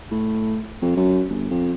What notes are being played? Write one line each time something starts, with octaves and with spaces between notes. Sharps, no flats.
A2
F2
F#2
G1
F2